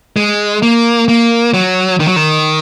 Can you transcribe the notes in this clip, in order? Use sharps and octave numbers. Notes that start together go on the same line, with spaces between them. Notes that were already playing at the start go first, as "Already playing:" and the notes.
G#3
A#3
A#3
F#3
D#3
F#3
D#3